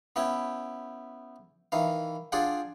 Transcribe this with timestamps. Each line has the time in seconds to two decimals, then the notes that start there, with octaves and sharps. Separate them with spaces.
0.16 B3 C#4 E4 G5
1.72 D#3 E3 F5
2.32 D4 F4 G#4 D5 F#5 G5